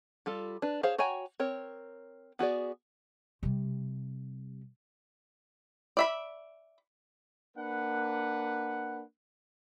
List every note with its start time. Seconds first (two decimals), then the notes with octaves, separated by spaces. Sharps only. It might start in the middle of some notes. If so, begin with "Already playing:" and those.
0.26 G3 F4 A4
0.62 D4 B4
0.83 G#4 C5 C#5 F5
0.98 F#4 C#5 G5 G#5 A#5
1.40 C4 A#4 C#5
2.39 B3 F#4 G#4 D5
3.43 C3 G3
5.97 D5 E5 B5
7.57 A#3 D4 B4 F#5